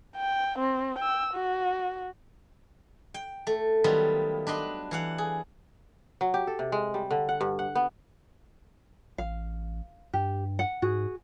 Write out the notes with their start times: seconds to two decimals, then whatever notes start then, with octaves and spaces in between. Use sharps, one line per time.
0.17 G5
0.59 C4
0.99 G5 E6
1.34 F#4
3.14 G5
3.47 A3
3.84 D#3 F#3 G3 B3 F4
4.47 D4 B4 D#5 C6
4.91 E3 F5 F#5
5.18 G#4
6.21 F#3
6.34 G4
6.47 A4
6.59 C3
6.72 G#3
6.94 G3
7.11 D3
7.29 F#5
7.41 G2
7.59 F#5
7.75 B3
9.18 A1 F5
10.14 G2 G4
10.59 F#5
10.82 G#2 F#4 G#4